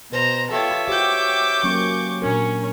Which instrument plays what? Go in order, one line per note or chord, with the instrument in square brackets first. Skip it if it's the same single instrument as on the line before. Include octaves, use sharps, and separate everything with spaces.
[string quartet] B2 C5 A#5 [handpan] B4
[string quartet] F4 G4 A4 [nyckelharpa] C#5 E5
[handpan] F#4 G4 C5 [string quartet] D6 G6
[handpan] F#3 A#3 C#4 [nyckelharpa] C#6
[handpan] A#2 D4 A#4 [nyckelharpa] C#4 C#5